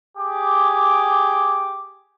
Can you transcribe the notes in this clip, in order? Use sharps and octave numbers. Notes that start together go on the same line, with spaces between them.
G4 G#4 D6